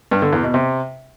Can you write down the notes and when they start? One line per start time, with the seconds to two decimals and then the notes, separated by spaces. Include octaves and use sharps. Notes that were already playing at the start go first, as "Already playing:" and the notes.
0.11 G2
0.22 D3
0.33 E2
0.43 B2
0.54 C3